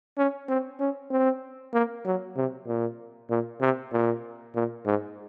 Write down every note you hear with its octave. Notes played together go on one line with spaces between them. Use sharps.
C#4
C4
C#4
C4
A#3
F#3
C3
A#2
A#2
C3
A#2
A#2
G#2